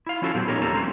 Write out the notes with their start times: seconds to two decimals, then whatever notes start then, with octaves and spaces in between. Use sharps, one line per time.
0.07 E4 F5
0.22 F3 C#4 F4 F#4 A4
0.35 A#2 F#3 B3 C4 G4
0.48 C#4 D#4 G4 A4 A#4 C#5
0.61 E2 G3 A#3 A4 A#5
0.73 G#3 A3 C4 C#4 E4 F#4